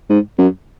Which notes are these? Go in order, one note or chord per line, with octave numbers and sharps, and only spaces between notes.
G#2
F#2